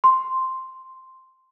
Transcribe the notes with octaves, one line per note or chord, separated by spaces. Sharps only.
C6